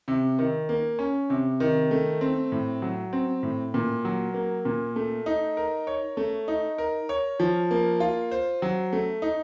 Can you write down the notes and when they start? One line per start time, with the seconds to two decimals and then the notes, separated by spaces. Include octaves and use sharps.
0.08 C3
0.39 D#3
0.69 A#3
0.99 C#4
1.30 C3
1.60 D#3
1.91 A3
2.21 C4
2.52 A2
2.82 F#3
3.13 C4
3.43 A2
3.74 A#2
4.05 F#3
4.34 A#3
4.65 A#2
4.96 A3
5.26 D#4
5.57 A#4
5.87 C#5
6.17 A3
6.48 D#4
6.78 A#4
7.09 C#5
7.40 F3
7.71 A#3
8.00 F4
8.31 C5
8.62 F#3
8.93 A3
9.22 D#4